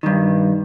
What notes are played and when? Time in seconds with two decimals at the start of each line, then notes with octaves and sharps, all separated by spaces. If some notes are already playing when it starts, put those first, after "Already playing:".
0.03 G2 D#3